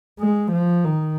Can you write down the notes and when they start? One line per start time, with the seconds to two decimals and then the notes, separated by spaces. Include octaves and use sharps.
0.20 G#3
0.52 F3
0.85 D#3